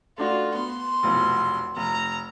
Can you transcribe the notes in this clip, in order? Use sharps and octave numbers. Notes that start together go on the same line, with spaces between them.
A3 D4 F4 F#4
B3 C6
F1 B1 E2
F1 A#5